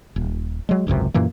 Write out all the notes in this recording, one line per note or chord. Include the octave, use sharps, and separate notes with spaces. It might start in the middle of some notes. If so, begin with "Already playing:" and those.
D#1
F#3 G#3
G#1 C#2 F#2 C3
F#2 A#2 E3 A#3